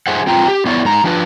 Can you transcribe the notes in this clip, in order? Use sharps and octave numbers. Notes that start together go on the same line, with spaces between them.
G#4 C5 E5 F#5
C4 F4 G5 A#5
G4
B3 E4 C#5 D5 E5
G#2 A#5
F3 D4 B4